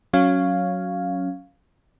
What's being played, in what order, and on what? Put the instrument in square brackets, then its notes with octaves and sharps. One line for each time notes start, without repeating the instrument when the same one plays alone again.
[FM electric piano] F#3 C#4 F5